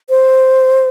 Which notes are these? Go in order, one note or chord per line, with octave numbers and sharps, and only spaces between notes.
C5